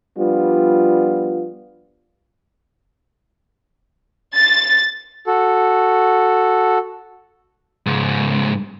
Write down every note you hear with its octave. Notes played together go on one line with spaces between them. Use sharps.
F3 G3 B3 D4 F4
A6
F#4 A4
C#2 G#2